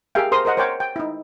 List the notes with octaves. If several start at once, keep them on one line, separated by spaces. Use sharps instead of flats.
G4 G#4 A#4 E5 F5 G5
A#4 C5 C6 D#6
A#4 C5 D#5 F#5
A#4 C5 C#5 F#5 G5 D6
G5
D#4 E4